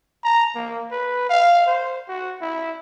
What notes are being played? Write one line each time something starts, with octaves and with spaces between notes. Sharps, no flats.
A#5
A#3
B4
F5
C5
F#4
E4